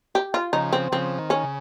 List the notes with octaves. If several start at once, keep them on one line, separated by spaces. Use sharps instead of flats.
G4
F4
C#3 F3 D#4
C4
C#3 F3 C4
D#3
C#4
C#3